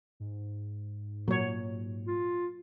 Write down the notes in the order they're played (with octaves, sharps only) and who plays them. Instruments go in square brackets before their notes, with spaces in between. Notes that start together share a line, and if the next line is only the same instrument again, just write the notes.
[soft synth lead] G#2
[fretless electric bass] A#2 [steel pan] F#3 C#5
[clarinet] F4